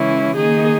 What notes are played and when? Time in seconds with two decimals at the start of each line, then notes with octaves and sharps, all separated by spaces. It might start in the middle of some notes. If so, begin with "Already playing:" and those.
Already playing: C#3 E3 G#3 C#4 E4
0.36 D#3 A#3 D#4 G#4